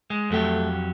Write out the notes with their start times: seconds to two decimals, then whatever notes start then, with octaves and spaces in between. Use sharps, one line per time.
0.10 G#3
0.30 F2 F#3 A3 G4